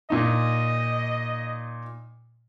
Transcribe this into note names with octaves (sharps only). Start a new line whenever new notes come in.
A#2 D#4 D#5